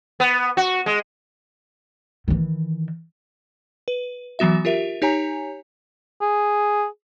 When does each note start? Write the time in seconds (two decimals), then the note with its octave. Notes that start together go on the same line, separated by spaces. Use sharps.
0.20 B3
0.57 F#4
0.86 G#3
2.28 D#3 E3
3.88 B4
4.39 E3 F#3 B3 F#4 E5
4.65 F4 G4 A#4 E5
5.02 D#4 G4 C#5 G#5 A#5
6.21 G#4